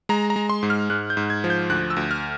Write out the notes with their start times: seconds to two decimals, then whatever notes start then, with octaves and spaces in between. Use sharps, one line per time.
0.09 G#3 A#5
0.30 A#5
0.36 G#3
0.49 C6
0.63 G#2
0.70 F6
0.90 G#2 F#6
1.10 G6
1.17 G#2
1.30 G#6
1.44 F3
1.50 G6
1.70 D2 F#6
1.90 E6
1.96 D2
2.11 F6